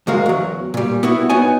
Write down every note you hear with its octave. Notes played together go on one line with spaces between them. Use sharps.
D2 G#2 G#3 F#4 A#4 F5
E2 F#3
A#2 G3
B3 E4 F#4
B3 D#4 F#4 C#5 G#5